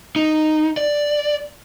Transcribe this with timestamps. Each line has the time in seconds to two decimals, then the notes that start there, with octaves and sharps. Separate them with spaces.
0.16 D#4
0.77 D5